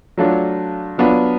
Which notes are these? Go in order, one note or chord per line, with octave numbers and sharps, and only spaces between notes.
F#3 A3 D4 F4
F#3 B3 D4 F4